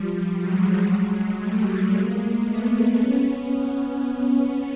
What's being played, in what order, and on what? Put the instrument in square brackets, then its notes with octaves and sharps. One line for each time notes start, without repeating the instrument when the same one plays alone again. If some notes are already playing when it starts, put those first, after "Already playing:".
Already playing: [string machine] F3 G3
F#3 G#3
G3 A3
G#3 A#3
A3 B3
B3 C#4
B3 C#4